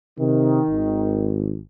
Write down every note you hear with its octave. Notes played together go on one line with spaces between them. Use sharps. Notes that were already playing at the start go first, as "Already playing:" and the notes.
C3 D#3
G#1